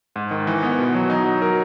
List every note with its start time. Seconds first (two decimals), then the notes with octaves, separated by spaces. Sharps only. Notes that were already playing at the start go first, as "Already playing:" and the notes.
0.16 G#2
0.31 D#3
0.47 E3
0.63 B3
0.78 B2
0.94 F#3
1.10 D#4
1.26 F#3
1.42 A#4